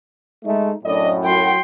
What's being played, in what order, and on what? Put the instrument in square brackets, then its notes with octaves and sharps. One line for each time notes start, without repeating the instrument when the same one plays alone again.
[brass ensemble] G#3 A3 D#4
[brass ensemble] F#2 A2 [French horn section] D4 D5 D#5
[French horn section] F#3 F#4 [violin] G5 C6